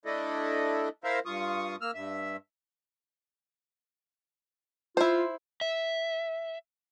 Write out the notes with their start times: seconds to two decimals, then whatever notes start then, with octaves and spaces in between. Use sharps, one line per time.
0.05 A3 D4 E4 A4 D#5
1.04 E4 A#4 C5 E5 F5
1.26 G2 F4 C#6 D#6
1.81 A#3 E6 F6
1.94 G2 E5
4.97 E4 F4 C5
5.61 E5